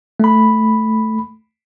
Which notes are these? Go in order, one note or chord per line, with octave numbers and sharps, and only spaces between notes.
A3 B5